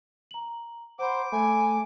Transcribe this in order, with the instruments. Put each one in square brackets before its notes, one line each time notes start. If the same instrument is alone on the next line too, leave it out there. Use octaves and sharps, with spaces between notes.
[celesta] A#5 F#7
[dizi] C5 [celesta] F#5 A#5 B5 [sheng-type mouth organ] D6
[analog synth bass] A3 [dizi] G#5 [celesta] B5